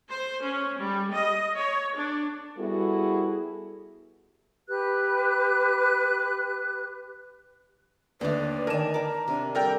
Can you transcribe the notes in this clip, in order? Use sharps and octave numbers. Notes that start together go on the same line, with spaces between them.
C5
C#4
G3
D#5
C#5
D4
G3 B3 E4 F#4 G#4 A4
G4 B4 F#6
D#2 D3 A3 B4 D5
D#3 A#4 G#5 A5 E7
B4 A#5 D6
C3 D4
G3 A4 A#4 D5 G5